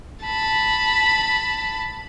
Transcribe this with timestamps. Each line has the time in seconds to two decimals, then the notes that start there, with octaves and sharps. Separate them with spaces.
0.25 A5 B5